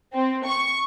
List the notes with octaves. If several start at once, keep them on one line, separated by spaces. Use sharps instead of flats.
C4
C#6